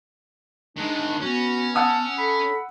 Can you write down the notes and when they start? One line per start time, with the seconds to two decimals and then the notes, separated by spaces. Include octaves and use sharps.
0.77 D#3 G#3 D4
1.22 B3 C#4 F#4
1.75 F#5 A5 D#6 E6
2.18 A4 B5